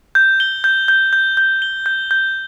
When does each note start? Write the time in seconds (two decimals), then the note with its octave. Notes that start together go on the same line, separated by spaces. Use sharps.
0.15 G6
0.40 G7
0.64 G6
0.88 G6
1.13 G6
1.37 G6
1.62 G7
1.86 G6
2.11 G6